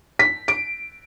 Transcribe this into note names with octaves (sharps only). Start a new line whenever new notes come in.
B6
D7